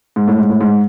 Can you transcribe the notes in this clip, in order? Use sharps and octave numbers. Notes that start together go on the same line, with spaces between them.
G#2
A2
G#2
A2
G#2